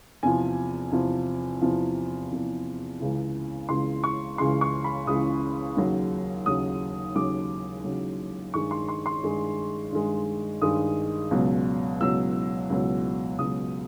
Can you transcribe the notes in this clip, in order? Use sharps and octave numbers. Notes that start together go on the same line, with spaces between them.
E2 C3 F3 G#5
E2 C3 F3
E2 C3 F3
E2 C3 F3
C#2 C#3 E3
C#2 C#3 E3 C6
C#6
C#2 C#3 E3 C6
C#6
B5
C#2 C#3 E3 D#6
D#2 C#3 F#3
D#2 C#3 F#3 D#6
D#2 C#3 F#3 D6
D#2 C#3 F#3
G2 D#3 G#3 C#6
C6
C6
C6
G2 D#3 G#3
G2 D#3 G#3
G2 D#3 G#3 D#6
C#2 B2 F#3
C#2 B2 F#3 E6
C#2 B2 F#3
C#2 B2 F#3 D#6